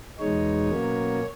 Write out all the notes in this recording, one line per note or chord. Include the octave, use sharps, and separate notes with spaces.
E2 B2 G#3 D#4 C#5
B2 F#3 A#3 C#4